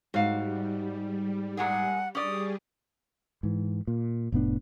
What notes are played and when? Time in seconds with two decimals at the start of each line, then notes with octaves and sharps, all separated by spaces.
0.14 G#2 G3 F#4 F5
1.57 A#2 G#3 G#4 F#5
2.15 G3 C#4 G4 G#4 D5 D#6
3.43 G#2 E3
3.87 A#2
4.32 F1 A2 B3 D4